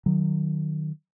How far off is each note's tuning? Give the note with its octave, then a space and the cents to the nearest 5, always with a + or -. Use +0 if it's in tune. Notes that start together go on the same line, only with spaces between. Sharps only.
D#3 -25 F#3 +0